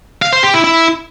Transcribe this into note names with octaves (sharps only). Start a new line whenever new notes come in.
F5
C5
G4
E4
E4